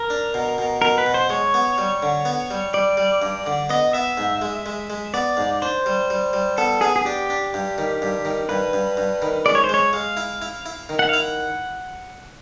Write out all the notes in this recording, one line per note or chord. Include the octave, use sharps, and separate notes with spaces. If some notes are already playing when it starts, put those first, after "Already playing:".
Already playing: A#4
D4
B2
B2
B2 A#4
B4
B2
C5
G#3 C#5
B3
G3
D3
B3
G3
G3 D5
G3
G2
D3
B3 D#5
B3 E5
G#2
G#3
G#3
G#3
B3 D5
G#2
D4 C5
G3
G3
G3
B3 A4
B3 G#4
G#4
D4 G4
D4
G2
D#3
G2
D#3
G2 B4
G2
G2
D#3
G#3 D5
C#5
C5
G#3 C#5
G#3 F5
E4
E4
E4
D#3
F#5
E4 F5
F#5